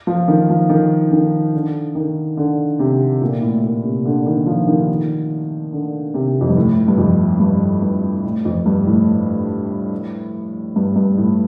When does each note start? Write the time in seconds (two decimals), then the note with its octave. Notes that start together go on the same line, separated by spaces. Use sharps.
0.07 F3
0.28 D#3
0.50 F3
0.69 D#3
1.12 D#3
1.54 D3
1.95 D#3
2.37 D3
2.79 C3
3.21 A#2
3.42 A2
3.63 A#2
3.84 C3
4.05 D3
4.26 D#3
4.46 F3
4.67 D#3
5.72 D3
6.14 C3
6.41 F2
6.49 G2
6.57 A2
6.88 G2
6.98 F2
7.40 G2
7.82 G2
8.25 A2
8.45 F2
8.66 G2
8.87 A2
10.76 G2
10.96 G2
11.18 A2